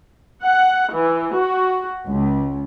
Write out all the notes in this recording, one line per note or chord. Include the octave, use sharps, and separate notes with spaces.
F#5
E3
F#4
C#2